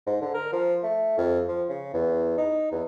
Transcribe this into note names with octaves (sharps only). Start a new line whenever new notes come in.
G#2
D3
A#4
F3
A3
F2
F3
C#3
E2
D#4
E2